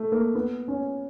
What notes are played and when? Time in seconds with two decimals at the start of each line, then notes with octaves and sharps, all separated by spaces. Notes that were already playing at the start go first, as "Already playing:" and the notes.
Already playing: A3
0.12 A#3
0.35 B3
0.68 C#4